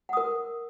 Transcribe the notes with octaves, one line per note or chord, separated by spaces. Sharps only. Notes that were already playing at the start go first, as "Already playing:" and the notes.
A#4 F#5 D#6